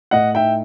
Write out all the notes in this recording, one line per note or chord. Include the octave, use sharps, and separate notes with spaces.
A2 D#5 F#5
D#4 E5 G5